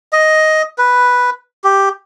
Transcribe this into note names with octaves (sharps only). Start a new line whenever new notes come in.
D#5
B4
G4